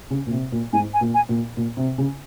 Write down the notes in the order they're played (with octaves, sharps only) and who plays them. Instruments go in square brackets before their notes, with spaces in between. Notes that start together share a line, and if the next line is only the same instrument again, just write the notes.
[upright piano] C#3
A#2
C3
A#2
[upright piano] G#2 [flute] G#5
[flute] G#5
[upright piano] A#2
[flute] G#5
[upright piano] A#2
A#2
C3
C#3